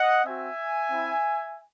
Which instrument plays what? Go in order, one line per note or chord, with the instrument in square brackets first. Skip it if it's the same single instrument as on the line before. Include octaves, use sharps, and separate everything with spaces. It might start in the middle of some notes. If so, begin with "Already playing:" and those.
Already playing: [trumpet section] D#5 F#5
C4 F#4 E5 G#5
C4 E4